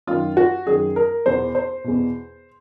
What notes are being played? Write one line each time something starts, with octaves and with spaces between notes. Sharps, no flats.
F#2 D#3 F4
F#4
F#2 D#3 G#4
A#4
E2 B2 C5
C5
E2 B2